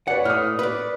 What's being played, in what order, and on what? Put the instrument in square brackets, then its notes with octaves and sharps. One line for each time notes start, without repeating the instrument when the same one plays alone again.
[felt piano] B4 C#5 D5 [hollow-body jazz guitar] F#5
[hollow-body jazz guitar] A2 [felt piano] D#6 F6
[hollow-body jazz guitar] B4 D5